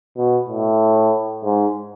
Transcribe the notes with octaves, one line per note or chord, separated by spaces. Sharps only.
B2
A2
G#2